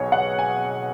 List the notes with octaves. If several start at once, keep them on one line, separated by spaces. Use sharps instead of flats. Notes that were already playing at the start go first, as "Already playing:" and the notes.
Already playing: B1 B2 G#4 C#5
F#5
G#5